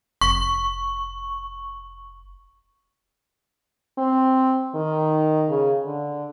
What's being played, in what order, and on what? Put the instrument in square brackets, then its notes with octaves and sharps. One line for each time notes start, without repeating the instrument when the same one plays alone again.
[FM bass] F1 [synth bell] C#6
[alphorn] C4
D#3
C#3
D3